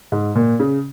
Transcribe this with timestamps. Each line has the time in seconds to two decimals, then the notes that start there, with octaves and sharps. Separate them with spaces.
0.12 G#2
0.35 A#2
0.60 C#3